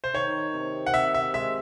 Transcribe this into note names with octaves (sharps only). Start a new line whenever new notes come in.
C5
D#3 C#5
C3
F#5
C3 E5
E5
G#3 E5